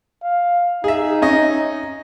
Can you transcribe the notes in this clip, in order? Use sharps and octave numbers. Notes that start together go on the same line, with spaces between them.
F5
D#4 G#4 E5
C#4 D#5